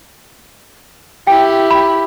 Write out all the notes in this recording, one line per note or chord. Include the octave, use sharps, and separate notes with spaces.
E4 G4 G5
B5